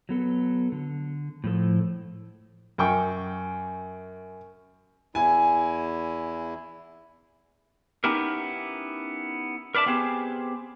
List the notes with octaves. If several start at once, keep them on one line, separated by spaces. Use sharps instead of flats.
F#3 B3 A4
D3
A2 F3 A4
F#2 G5 C#6
E2 E4 G#5
B3 C#4 D#4 E4 G4 A#4
A#4 B4 D5 E5 A5
B3 C4 G4 G#4